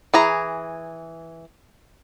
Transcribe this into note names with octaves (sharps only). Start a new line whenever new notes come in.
E3 G#4 A#5